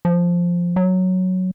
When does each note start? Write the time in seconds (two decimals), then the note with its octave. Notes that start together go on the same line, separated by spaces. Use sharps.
0.05 F3
0.76 F#3